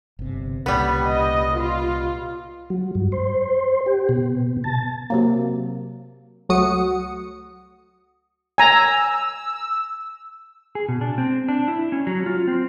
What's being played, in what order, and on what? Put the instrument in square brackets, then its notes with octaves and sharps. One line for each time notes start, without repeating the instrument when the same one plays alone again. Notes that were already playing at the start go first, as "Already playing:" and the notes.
[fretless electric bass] G1 C3
[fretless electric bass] C2 A#2 C#3 [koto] G3 B3
[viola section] D#5
F4
[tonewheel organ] F#3
G2
C5
G4
B2
A5
[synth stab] C3 F#3 A#3
C#2 F#3 A3 F#4 D#6 C#7
[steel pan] G#5 A#5 [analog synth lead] E6
[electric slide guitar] G#4
B2
D4
C4
D4
E4
C#4
F#3
F4
C4